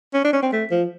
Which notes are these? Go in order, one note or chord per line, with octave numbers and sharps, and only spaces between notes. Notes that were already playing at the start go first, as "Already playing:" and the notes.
C#4
D4
C#4
C4
A3
F3